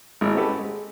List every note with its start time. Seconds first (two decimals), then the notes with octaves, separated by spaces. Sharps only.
0.21 G#1 G#3 E4 B5 D#6
0.34 C4 C#4 F#4 G4 A4 B4
0.60 G#3